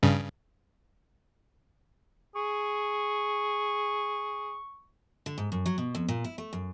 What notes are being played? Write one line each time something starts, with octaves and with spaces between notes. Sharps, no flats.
G2 C#3
G#4 C#6
D3
G#2
F#2
F#3
B2
F2
A#2
E4
A3
F#2